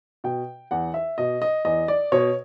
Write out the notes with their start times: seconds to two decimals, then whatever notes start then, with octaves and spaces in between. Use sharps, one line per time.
0.24 B2 G5
0.71 E2 F#5
0.94 E5
1.18 B2 D#5
1.42 D#5
1.65 E2 D#5
1.88 D5
2.12 B2 C#5